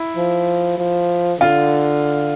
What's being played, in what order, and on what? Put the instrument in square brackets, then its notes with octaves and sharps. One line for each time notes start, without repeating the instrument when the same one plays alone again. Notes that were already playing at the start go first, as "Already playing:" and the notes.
Already playing: [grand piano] E4
[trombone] F3
F3
[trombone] D3 [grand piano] F4